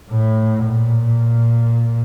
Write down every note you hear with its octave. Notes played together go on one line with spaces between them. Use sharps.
A2
A#2